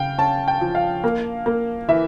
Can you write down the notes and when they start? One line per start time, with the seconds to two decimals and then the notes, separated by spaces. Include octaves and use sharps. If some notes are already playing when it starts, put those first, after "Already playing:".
Already playing: C#3 F5 G5
0.18 C#4 A5
0.48 G5
0.61 F3
0.75 F5
1.04 A#3
1.46 A#3
1.88 E3 E5